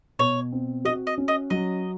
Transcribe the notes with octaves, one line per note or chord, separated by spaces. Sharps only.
B2 C#5
C4
F#4 D#5
D#5
C#4
D#5
F#3 D#5